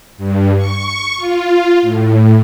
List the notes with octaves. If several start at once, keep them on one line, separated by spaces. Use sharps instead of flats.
G2
C#6
F4
A2